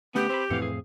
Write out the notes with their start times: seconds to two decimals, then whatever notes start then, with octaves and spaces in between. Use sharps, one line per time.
0.15 D3 A3 B3 C#4 G4
0.29 C4 B4 C5 B5
0.50 F2 A2 E3 C4 F5 F#5
0.62 G#4 F5